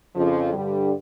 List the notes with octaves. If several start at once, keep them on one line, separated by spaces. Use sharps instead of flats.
F2 C#3 F3
G2 D3 G3